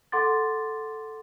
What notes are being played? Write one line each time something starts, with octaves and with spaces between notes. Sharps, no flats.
A4 F#5 C6 D6 A6